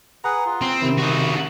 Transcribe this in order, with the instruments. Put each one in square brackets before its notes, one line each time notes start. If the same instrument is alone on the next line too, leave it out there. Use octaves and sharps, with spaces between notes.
[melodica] G#4 B4 F#5 [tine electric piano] A#5
[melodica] F4
[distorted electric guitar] C4
[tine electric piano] C3 D#3 [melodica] E4
[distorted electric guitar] D#4 F#4 [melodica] E4